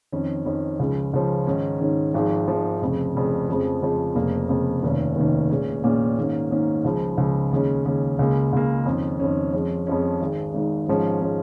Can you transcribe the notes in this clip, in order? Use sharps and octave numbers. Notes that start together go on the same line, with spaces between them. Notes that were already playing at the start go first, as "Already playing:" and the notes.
F2 D#3 C#4
F2 D#3 C#4
C#2 C#3 F3 C#4
C#2 C#3 F3 C#4
G#2 D#3 C#4
G#2 D#3 C#4
G#1 G#2 F3 G#3
G#1 G#2 F3 G#3
F1 F2 C#3
F1 F2 C#3
F2 C#3 F3 G#3
F2 C#3 F3 G#3
F1 F2 C#3 A#3
F1 F2 C#3 A#3
F1 D#2 D#3 C#4
F1 D#2 D#3 C#4
A#1 A#2 G#3 C#4
A#1 A#2 G#3 C#4
G#2 D#3 A#3 C#4
G#2 D#3 A#3 C#4
C#2 C#3 F3
C#2 C#3 F3
D#2 C#3 G#3 C#4
D#2 C#3 G#3 C#4
C#2 C#3 A#3
C#2 C#3 A#3
F2 D#3 C#4
F2 D#3 C#4
F2 F3 G#3 C#4
F2 F3 G#3 C#4
G#1 G#2 D#3 G#3
G#1 G#2 D#3 G#3
G#1 G#2 F3 G#3 C#4
F3 G#3 C#4